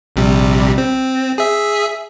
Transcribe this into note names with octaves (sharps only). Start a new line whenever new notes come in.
A#1 C3 G3
C4
G#4 E5